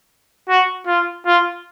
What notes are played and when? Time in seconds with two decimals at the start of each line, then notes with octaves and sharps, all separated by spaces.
0.49 F#4
0.87 F4
1.26 F4